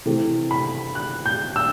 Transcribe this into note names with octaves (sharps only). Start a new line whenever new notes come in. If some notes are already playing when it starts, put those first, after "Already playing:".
C3 E3 A3
B5
F#6
G6
E6